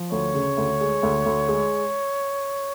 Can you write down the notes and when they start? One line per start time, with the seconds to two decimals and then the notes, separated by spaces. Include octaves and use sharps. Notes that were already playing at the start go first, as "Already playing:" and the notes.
Already playing: F3
0.11 D2 C#5
0.34 C#3
0.57 D2
0.80 G#3
1.03 D2
1.26 D2
1.48 G#3